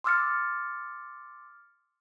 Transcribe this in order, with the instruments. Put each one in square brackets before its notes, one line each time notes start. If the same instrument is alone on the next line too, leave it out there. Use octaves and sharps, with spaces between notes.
[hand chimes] C6 D6 E6 F6 A6 C#7